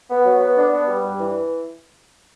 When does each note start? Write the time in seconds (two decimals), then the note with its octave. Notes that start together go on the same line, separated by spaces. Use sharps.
0.09 B3
0.25 F#3
0.40 B3
0.56 D4
0.72 B3
0.88 G3
1.03 G2
1.19 E3